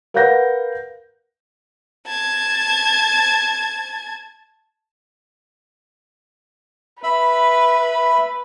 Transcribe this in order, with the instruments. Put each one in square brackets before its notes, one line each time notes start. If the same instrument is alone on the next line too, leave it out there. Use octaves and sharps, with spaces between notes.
[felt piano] A#4 B4 F5 F#5 G6 A#6
[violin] A5 G#6
[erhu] B4 [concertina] E5 B5